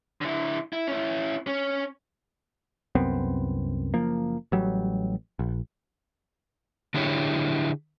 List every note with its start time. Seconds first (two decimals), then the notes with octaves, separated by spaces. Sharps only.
0.21 D3 E4
0.73 E4
0.87 C#4 E4
1.47 C#4
2.95 C2 F#2 B3 C4
3.94 F#1 F3 A#3
4.52 A1 F#3 G3
5.39 A#1
6.94 D3 D4 E4 G4 G#4 C#5